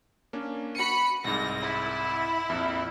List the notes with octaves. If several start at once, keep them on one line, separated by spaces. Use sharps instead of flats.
A#3 C#4 D4
F#4 B5 C#7 D#7
C2 G#2 A#6
E4
A#1 F2